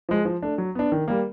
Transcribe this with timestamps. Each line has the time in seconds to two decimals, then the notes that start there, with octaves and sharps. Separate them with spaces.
0.09 F3 G#3
0.25 F3
0.43 A3 D4
0.58 F#3
0.75 B3 D4
0.92 D#3
1.08 G3 A#3